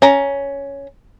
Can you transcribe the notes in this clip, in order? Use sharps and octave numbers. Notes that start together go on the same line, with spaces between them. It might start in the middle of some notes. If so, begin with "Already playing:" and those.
C#4 A#5